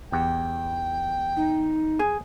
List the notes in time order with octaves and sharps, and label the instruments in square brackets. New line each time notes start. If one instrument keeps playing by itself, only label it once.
[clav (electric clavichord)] E2 G4 F#5 [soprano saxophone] G5
[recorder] D#4
[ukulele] G#4